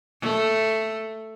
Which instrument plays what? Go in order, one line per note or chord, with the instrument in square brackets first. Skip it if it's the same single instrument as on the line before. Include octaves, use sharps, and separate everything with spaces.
[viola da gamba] A3